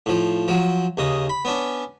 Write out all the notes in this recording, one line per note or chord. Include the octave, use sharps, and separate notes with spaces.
A2 F3
F3 F#3
D#2 C#3 D#5
B5
B3 C#4 D4